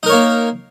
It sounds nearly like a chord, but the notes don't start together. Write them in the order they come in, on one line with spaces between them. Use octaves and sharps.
D#4 A#4 C#5 A#3